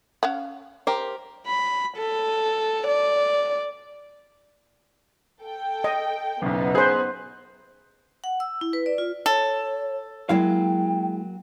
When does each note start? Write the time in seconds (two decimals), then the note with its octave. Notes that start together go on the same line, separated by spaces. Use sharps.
0.23 C#4 F5 F#5
0.87 G4 A#4 C5
1.47 B5
1.97 A4
2.88 D5
5.43 A4 G5
5.84 D#5
6.42 F#1 B1 B3 D#4
6.75 G#4 B4 C5
8.24 F#5
8.40 E6
8.61 E4
8.73 B4
8.86 D5
8.98 F4
9.26 A4 C#5
10.29 F#3 G#3 A#3 E4 F5 G5